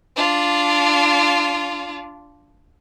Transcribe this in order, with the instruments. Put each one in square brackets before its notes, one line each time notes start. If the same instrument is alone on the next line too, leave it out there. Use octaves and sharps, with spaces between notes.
[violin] D4 F4